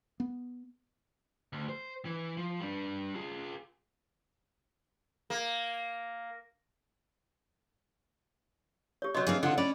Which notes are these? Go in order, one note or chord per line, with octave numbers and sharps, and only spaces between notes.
B3
D2
C5
E3
F3
G3 D4
F4 G#4
A#3
G4 C#5
B2 F#3 C#5 D#5 C6
E3 C4 D4 G#4 F5
D3 F3 C#4 F4 F#5
C#4 D5 B5